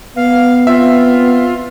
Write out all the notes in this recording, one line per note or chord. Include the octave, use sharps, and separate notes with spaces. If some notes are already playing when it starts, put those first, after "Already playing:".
B3 F5
C4 F4 E5